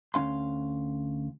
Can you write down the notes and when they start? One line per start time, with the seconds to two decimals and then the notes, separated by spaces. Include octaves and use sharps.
0.14 D2 A#3 C#4 F5 C6